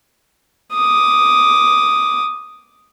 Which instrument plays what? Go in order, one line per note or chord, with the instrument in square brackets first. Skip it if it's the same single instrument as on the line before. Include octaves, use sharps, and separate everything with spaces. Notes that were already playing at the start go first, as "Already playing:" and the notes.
[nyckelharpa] D6 D#6